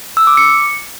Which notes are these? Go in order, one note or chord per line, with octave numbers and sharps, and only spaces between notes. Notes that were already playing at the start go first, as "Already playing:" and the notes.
E6
D6
C#7